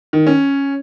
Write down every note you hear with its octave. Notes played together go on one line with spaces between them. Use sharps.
D#3
C#4